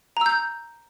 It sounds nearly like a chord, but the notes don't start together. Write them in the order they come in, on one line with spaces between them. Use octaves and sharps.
A#5 E6 G6